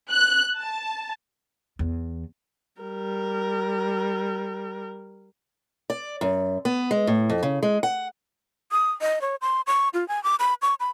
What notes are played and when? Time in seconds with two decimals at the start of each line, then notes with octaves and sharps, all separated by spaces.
0.10 F#6
0.59 A5
1.79 E2
2.82 G3 A#4
5.90 D5
6.21 F#2
6.65 B3
6.91 G#3
7.07 A2
7.30 F2
7.43 C#3
7.63 G#3
7.83 F#5
8.72 D#6
9.01 D#5
9.21 C#5
9.42 C6
9.67 C#6
9.94 F4
10.08 G#5
10.24 D6
10.40 B5
10.62 C#6
10.80 B5